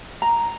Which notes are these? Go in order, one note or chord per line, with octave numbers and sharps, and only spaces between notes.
A#5